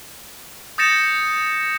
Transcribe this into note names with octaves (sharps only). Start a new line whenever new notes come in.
D#6 G6 A6 A#6 C#7 E7